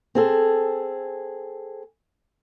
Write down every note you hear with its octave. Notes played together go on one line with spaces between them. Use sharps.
C4 G#4 A4